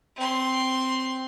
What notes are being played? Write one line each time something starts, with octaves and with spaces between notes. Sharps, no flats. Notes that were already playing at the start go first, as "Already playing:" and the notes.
C4 C6